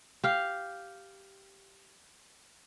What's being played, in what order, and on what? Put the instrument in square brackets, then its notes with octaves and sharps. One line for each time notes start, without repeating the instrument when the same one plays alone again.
[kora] G4 F5